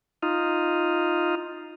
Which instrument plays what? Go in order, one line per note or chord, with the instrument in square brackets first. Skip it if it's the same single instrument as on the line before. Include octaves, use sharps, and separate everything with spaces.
[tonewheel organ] D#4 F4